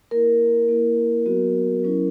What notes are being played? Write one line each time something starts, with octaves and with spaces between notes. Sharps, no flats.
A#3 E4 A#4
A#3 E4
F#3 B3 F#4
F#3 C#4 E4